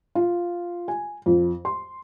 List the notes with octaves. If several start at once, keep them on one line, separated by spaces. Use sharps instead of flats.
F4
G#5
F2
C6